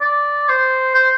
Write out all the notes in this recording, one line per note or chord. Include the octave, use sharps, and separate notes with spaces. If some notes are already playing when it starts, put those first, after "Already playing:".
D5
C5
C5